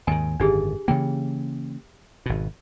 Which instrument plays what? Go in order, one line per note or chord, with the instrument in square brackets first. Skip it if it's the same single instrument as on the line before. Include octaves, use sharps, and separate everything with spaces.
[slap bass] D#2 G#2 D#3 [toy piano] G#5
[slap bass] G#1 F#2 D3 [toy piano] D4 G4 G#4
[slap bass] C#3 E3 A#3 [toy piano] G5
[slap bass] G#1 B2